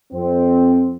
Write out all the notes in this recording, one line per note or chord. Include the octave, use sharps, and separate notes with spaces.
F2 C4